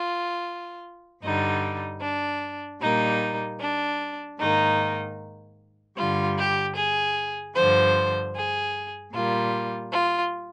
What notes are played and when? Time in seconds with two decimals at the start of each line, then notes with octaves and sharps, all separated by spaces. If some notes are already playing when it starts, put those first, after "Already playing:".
Already playing: F4
1.22 G2 D3 G3 D#4
2.01 D4
2.81 A#2 G3 A#3 D#4
3.60 D4
4.39 G#2 D#3 A#3 D#4
5.97 G2 D3 G3 F4
6.37 G4
6.76 G#4
7.55 G2 D3 F3 C5
8.35 G#4
9.13 A#2 G3 A#3 F4
9.92 F4